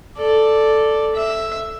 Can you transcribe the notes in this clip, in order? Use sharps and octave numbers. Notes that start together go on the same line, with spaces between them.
A4 D5
E5